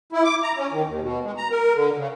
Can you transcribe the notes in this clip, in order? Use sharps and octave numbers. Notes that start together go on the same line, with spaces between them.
E4
D6
A#5
C#4
D#3
D#2
B2
G#3
A#5
A#4
D3
C#3